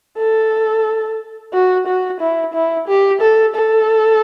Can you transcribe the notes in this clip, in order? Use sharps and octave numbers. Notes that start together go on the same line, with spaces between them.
A4
F#4
F#4
E4
E4
G4
A4
A4